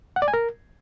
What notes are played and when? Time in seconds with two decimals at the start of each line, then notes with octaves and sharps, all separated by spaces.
0.16 F#5
0.22 D5
0.28 G#5
0.34 A#4